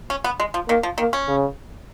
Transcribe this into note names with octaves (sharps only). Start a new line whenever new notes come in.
C#4
B3
G#3
F3
D#3 A#3
F3
D#3 A#3
C#4
C#3